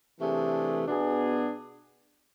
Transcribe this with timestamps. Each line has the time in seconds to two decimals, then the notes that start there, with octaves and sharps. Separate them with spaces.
0.19 C3 E3 A3 D4 G#4
0.86 B2 B3 D4 G#4